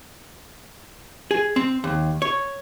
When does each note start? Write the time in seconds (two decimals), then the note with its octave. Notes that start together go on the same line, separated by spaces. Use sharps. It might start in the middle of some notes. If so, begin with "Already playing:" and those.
1.31 G#4
1.56 C4
1.84 D#2
2.22 C#5